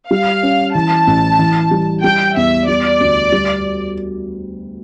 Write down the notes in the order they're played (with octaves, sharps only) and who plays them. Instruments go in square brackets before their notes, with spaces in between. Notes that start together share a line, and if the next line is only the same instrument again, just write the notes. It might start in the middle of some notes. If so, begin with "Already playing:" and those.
[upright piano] G3 [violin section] F5
[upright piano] C#4
[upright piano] E3 [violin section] A5
[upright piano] A1
E3
G3
[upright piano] G3 [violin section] G5
[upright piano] E2 [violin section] E5
[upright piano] G3 [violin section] D5
[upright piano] D2
G3